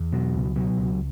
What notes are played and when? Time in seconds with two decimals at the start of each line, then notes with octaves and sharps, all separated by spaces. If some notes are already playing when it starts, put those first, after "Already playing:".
Already playing: E2
0.13 B2 F#3
0.34 C#2
0.56 B2 F#3
0.78 C#2